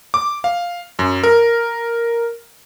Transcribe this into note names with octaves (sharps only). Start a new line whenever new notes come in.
D6
F5
F#2
A#4